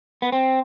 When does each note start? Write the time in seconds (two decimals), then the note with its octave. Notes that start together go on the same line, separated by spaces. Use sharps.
0.22 B3
0.32 C4